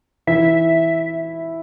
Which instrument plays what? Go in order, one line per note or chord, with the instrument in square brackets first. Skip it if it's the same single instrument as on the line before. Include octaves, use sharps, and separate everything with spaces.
[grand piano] E3 E4 [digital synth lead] E5